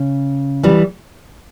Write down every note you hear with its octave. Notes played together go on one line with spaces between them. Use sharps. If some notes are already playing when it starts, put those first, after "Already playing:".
Already playing: C#3
E3 G3